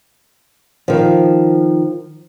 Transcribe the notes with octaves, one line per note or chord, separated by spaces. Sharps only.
D#3 F3